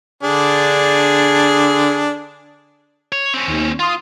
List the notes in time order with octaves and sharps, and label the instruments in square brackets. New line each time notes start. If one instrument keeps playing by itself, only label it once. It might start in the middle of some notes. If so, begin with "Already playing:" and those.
[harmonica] D3 D4 G#4
[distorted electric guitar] C#5
C4 C#4
[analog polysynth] D#2
[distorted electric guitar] F4 [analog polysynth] C6 D#6